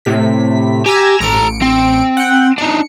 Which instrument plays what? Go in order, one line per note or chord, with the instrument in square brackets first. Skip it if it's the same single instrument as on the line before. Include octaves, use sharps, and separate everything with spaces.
[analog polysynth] A2 C3 B6
[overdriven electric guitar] G4 [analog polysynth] G#5 A#5 E6
[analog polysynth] A1 C#7 D7 [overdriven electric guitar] A4 A#5
[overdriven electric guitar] C4
[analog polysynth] F#5 G5
[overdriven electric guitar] D4 D#4 [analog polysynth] C#7